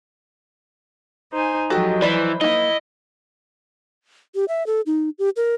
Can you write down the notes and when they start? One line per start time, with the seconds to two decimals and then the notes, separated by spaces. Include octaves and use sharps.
1.33 D#4 C5 G#5
1.70 F3 F#3 G#3 F#4 G4 A4 D#5
2.02 E3 B4 C5 D5 B5
2.41 A#3 D#4 E4 D#5
4.35 G4
4.48 E5
4.67 A4
4.86 D#4
5.19 G4
5.37 A#4